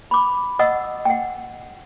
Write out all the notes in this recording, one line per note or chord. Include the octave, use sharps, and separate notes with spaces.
B5 D6
D#5 F#5 D#6 E6
F#5 G5